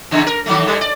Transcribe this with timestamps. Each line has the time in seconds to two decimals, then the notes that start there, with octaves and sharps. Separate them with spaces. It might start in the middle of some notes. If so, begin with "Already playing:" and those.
0.11 E2 C#3
0.27 A#4
0.46 D#3 F#3 A3
0.66 A2 G3
0.81 D5